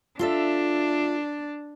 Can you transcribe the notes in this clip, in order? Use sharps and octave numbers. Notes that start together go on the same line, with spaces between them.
D4 F4 A4 E5